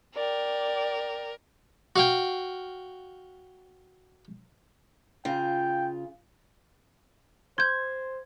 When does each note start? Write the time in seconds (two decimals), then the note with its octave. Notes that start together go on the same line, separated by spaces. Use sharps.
0.16 A#4 D5 G5
1.96 F#4 F5 G5
5.25 C#3 F4 G5
7.58 C5 C6 G6 G#6